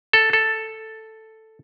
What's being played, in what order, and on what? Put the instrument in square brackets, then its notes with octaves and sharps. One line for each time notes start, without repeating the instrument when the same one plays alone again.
[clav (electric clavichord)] A4
A4